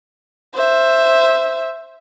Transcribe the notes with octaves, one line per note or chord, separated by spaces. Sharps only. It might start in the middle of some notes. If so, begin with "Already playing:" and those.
C5 E5